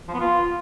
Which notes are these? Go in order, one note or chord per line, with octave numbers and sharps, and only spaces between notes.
F3
B3
F4